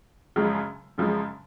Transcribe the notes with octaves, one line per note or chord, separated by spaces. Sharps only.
F#2 C#3 F3 G#3
F#2 C#3 F3 G#3